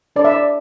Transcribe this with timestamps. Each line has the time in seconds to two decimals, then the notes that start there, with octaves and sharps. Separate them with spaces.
0.16 D4 A4 C#5 D5
0.25 E5
0.32 D5